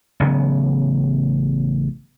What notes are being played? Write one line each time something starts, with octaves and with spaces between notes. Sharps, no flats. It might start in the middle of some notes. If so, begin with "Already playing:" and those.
A1 C#3 F#3 B3